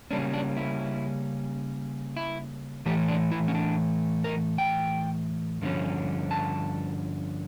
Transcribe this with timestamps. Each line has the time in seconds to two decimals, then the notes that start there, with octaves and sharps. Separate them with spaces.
0.11 C#3 G3 A#3 C#4 D4
0.33 D4
0.57 E4
2.17 E4
2.86 A2 E3 A3 G4
3.09 D4
3.31 E4
3.48 C#4
3.55 D4
4.24 A#4
4.58 G5
5.62 G2 D3 F3 C#4
6.31 A5